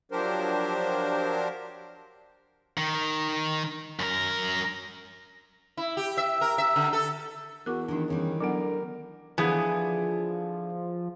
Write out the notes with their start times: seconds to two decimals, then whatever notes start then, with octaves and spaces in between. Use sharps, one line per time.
0.12 F3 F#3 D4 G4 A#4 C5
2.78 D#3
4.00 F#2 A#4
5.77 E4
5.97 G4
6.17 E5
6.41 A#4
6.58 E5
6.76 D3
6.93 A4
7.66 E2 F#4 A#4 D6
7.88 D#3 E3 A3 D4 D#4
8.08 D2 C#3 E3 G3
8.40 D3 F#3 B3 A#4 F#5
9.38 D3 E3 F3 B3 G#4 G#5